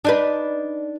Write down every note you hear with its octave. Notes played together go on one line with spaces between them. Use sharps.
D4 D#4 B4